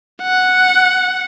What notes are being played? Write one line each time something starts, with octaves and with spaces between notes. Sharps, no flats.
F#5